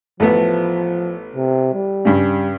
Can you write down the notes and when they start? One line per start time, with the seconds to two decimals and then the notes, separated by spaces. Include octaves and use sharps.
0.20 A1 F3 A3 B3
1.36 C3
1.73 G3
2.05 G2 C#3